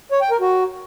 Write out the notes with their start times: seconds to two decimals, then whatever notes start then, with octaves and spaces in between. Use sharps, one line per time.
0.12 C#5
0.21 G5
0.31 A#4
0.40 F#4